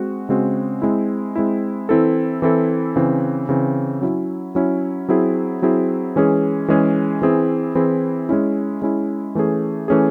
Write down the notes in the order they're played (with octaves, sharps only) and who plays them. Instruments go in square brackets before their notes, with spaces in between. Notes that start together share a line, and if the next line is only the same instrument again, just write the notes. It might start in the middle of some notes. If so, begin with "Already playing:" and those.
Already playing: [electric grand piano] G#3 C4 F#4
C#3 G#3 C4 F#4
G#3 C4 E4
G#3 C4 E4
E3 C4 E4 A4
E3 C4 E4 A4
C#3 E3 C4
C#3 E3 C4
F#3 C#4 E4
F#3 C#4 E4
F#3 C4 E4 G#4
F#3 C4 E4 G#4
E3 G#3 C#4 G#4
E3 G#3 C#4 G#4
E3 C4 E4 G#4
E3 C4 E4 G#4
G#3 C#4 E4
G#3 C#4 E4
E3 A3 C#4 G#4
E3 A3 C#4 G#4